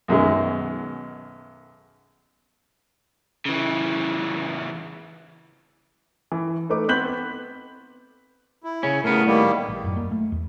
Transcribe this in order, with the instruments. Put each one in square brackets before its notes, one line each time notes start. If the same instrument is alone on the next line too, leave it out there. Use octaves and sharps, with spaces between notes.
[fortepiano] B1 F#2 D#3 G#3
[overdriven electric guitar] C#3 E3
[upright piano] E3
A3 D#4 B4 D6
B3 C4 F#6 G6 B6 F#7
[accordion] E4
[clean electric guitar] C#3 C#4
[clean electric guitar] A2 B3 [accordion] C#3 A#4
[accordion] D#3 G3 A#3
[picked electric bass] A1
F#2
A#3
A3
E2